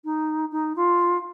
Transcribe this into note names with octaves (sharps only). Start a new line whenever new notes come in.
D#4
D#4
F4